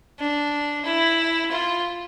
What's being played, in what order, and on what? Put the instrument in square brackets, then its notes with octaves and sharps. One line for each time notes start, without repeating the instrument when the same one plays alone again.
[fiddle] D4
E4
F4